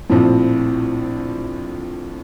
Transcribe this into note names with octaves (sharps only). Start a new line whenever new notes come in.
A#1 A2 F3 C4